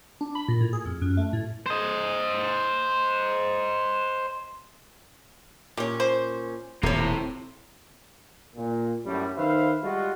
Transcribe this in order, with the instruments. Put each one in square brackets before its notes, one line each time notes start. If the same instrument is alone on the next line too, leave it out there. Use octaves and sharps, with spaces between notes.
[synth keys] D4
B5
A#2
A2
G#4
F2
F#2
A3
A2
[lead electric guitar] C5 D#5
[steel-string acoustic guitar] A#2 C#4 [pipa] G4
[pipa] C5
[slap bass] D#1 [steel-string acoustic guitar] A2 C3 [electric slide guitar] C4 A#5
[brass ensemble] A#2
F#2 A2 D3 G3
D#3 B4 C5 E5 F5
G3 G#3 F4 F#4